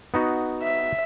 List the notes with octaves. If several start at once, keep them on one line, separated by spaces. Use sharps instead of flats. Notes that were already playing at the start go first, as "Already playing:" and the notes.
B3 D#4 F#4
E5